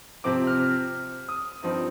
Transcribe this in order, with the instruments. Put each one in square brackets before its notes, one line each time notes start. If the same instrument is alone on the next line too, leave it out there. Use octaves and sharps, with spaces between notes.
[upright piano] C3 F3 C4 D6
F6
D#6
G2 F3 C4 D#4